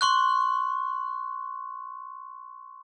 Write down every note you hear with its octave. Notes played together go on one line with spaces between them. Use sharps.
C6 C#6 F#6